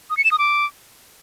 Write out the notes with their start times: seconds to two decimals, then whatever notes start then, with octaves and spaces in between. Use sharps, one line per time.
0.10 D#6
0.17 C#7
0.24 E7
0.31 D#6
0.39 D6